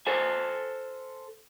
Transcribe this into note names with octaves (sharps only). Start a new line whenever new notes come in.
A4 C5 G#5